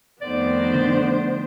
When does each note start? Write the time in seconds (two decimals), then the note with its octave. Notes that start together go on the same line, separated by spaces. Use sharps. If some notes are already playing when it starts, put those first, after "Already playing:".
0.21 F2 D#3 A3 B3 C5 D5
0.74 D3